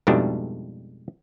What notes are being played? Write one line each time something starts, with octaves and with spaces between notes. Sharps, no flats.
F2 G#2 B2 G3 A3 D4